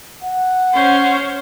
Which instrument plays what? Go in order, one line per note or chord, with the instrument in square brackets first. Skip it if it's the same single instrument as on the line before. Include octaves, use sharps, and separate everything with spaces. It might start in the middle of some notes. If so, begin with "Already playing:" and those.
[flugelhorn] F#5
[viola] C#4 C5